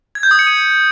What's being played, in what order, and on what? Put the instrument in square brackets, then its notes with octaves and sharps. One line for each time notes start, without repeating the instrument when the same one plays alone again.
[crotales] G#6
G6
D#6
C#7
D#7